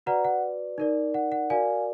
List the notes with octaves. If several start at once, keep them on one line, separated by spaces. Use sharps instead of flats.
F#4 B4 D5 F#5 A#5
F#5
D#4 A#4 D5
F#5
F#5
F#4 A#4 D5 F5 G#5